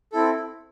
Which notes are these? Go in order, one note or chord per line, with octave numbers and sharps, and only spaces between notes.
C4 E4 A4